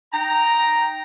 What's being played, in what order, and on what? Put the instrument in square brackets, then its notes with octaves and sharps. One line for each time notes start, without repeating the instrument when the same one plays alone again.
[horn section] D#4 G5 A#5